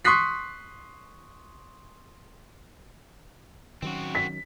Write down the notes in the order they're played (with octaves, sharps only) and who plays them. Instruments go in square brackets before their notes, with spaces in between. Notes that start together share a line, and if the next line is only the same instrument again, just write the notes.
[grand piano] C6 C#6 D#6 F#6 B6 C7
[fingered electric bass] D#3 F#3 C#4 [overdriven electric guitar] C4 F#4
[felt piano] B6